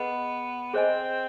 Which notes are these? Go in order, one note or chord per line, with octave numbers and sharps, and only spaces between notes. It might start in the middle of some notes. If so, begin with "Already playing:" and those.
Already playing: B3 G#4 B4 D#5 F#5
C4 G#4 C5 D#5 G#5